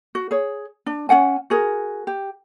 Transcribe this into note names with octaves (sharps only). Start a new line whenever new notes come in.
F#4
G#4 C#5
D4
C#4 F#4 F#5 G#5
F#4 G#4 A#4
G4